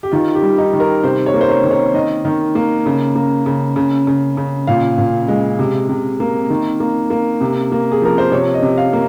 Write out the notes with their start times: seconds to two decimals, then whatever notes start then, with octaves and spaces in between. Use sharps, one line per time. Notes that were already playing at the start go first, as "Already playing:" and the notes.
0.03 G4
0.12 D#3 F4
0.35 G4
0.42 G3
0.58 D#4
0.73 D#3
0.80 A#4
1.03 C3 C5
1.26 C#5
1.34 A#3
1.41 C5
1.49 C#5
1.64 D#3
1.71 C#5
1.94 D#3 D#5
2.25 D#3
2.55 A#3
2.86 C#3
3.15 A#3
3.46 C#3
3.76 C#3
4.07 C#3
4.37 C#3
4.67 A#2 F5
4.98 A#2
5.28 G#3
5.59 C3
5.89 C3
6.20 A#3
6.50 D#3
6.80 A#3
7.10 A#3
7.41 C3
7.72 A#3
7.92 G#4
8.02 F3 A#4
8.18 C5
8.31 C3 C#5
8.54 D#5
8.63 C3
8.77 F5
8.93 A#3